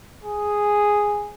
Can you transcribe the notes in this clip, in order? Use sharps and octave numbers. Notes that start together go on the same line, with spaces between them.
G#4